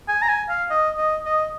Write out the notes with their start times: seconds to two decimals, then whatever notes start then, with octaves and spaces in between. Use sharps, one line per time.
0.08 G#5
0.22 A#5
0.28 G#5
0.49 F5
0.70 D#5
0.97 D#5
1.26 D#5